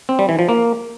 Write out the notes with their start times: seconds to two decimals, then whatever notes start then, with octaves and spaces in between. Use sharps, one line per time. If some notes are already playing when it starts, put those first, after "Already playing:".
0.09 C4
0.19 G3
0.29 E3
0.39 F3
0.49 A#3